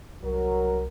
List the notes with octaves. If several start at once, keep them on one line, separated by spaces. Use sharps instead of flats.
C2 F#3 A#4